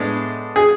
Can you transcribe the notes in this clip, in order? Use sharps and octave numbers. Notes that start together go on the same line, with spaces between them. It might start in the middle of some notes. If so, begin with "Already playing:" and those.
Already playing: A2 G#3 B3 D4
G#4